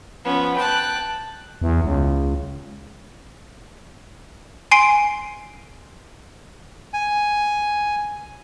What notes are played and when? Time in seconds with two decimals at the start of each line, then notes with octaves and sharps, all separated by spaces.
0.24 F3 B3 C#4
0.57 G5 A5 F#6
1.62 E2
1.84 C#2
4.71 G#5 C6 C7 D7
6.94 G#5